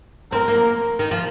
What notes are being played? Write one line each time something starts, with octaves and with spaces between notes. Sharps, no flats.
C4 A#4
A#3
D#3
F3